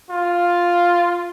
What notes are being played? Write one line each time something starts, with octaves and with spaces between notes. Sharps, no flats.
F4